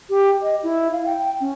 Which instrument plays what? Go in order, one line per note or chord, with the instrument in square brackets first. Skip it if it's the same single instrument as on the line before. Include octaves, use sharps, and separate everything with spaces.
[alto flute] G4
D#5
E4
F5
G5
C#4